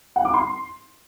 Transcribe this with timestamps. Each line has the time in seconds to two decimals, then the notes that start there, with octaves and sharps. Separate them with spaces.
0.16 F#5
0.25 D6
0.34 C6